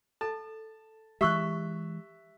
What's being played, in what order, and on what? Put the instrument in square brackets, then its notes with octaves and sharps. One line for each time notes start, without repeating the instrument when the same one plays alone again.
[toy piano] A4 [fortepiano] A5
[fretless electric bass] E3 G#3 [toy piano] G4 C#6 [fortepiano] E5 E6 F#6